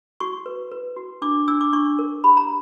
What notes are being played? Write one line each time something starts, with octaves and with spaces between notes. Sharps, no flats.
F#4 C#6
B4
B4
F#4
D4 D6
D4 E6
D6
D4 C#6
A#4
G4 B5
A#5